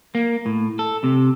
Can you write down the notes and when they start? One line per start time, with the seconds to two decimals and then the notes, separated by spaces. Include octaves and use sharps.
0.15 A#3
0.46 A2
0.79 A4
1.04 C3